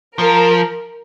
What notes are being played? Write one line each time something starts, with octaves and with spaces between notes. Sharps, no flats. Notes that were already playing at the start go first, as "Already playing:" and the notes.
F3 A#4